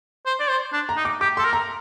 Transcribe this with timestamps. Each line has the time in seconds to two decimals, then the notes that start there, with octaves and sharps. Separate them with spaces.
0.26 C5
0.40 D5
0.49 C5
0.73 D4
0.89 A#5
0.97 D#4
1.05 D6
1.21 G4 D6
1.37 A4 C6
1.45 A#4
1.53 A#5